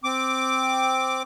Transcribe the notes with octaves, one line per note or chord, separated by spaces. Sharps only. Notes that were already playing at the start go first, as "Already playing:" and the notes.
C4 D6